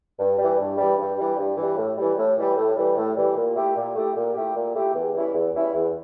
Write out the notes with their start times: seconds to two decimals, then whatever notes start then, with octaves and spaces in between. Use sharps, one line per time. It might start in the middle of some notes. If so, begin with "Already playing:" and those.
0.19 G2
0.38 E3 G3
0.58 G2
0.78 E3 G3
0.98 G2
1.18 E3 G3
1.38 G2
1.57 E3
1.62 G3
1.77 A2
1.97 E3 G3
2.17 A2
2.37 E3 G3
2.57 A2
2.76 E3 G3
2.97 A2
3.16 E3 G3
3.36 A#2
3.55 A3 E4 G4
3.76 A#2
3.95 A3 E4 G4
4.15 A#2
4.34 A3 E4 G4
4.55 A#2
4.74 A3 E4 G4
4.94 E2
5.14 E3 G3 C#4 E4
5.34 E2
5.53 E3 G3 C#4 E4
5.74 E2